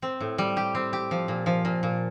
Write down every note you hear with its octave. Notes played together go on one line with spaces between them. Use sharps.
C4
A2
G3
G4
C4
G4
F3
A#2
F3
A#2
A#2